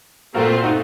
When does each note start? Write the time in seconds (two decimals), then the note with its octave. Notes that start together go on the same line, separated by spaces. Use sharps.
0.34 A#2 A3 C4 F4 F#4 A#4
0.64 D#4 F#4